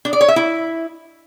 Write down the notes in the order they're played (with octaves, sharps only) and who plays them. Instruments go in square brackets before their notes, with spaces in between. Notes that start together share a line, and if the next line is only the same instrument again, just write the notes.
[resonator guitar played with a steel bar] D4
D5
C#5
E5
E4